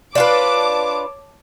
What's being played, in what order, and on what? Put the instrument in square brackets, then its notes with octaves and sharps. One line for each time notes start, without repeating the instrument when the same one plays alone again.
[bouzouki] D4 F4 B4 [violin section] C#5 A5 D6